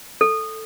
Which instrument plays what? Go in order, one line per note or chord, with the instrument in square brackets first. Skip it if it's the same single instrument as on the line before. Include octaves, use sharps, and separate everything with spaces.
[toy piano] A4